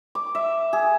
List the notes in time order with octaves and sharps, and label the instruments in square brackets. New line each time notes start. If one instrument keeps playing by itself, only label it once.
[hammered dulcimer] D6
E5
G#4